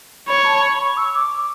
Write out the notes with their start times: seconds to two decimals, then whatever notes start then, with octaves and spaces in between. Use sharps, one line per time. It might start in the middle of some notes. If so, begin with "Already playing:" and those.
0.27 C#5 B5
0.45 A5
0.61 B5
0.79 C#6
0.97 E6
1.14 D6